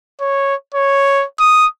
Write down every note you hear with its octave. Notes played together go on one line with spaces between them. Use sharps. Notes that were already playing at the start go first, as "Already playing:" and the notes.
C#5
C#5
D#6